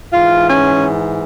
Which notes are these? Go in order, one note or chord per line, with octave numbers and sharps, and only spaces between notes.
G#2 E3 F4
C#4